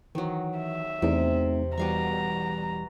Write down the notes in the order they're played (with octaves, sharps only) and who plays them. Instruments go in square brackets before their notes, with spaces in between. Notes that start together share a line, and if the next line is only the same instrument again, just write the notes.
[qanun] D#3 F#3 [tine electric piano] E3
[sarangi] E5
[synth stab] E2 [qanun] C3 [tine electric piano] A3 C4 D#4
[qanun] B2 F5 C#6 [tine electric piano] E3 G3 G4 [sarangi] A#5